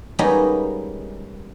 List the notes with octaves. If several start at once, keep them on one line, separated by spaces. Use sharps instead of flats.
G3 G#3 A#3 B3 C#4 D#4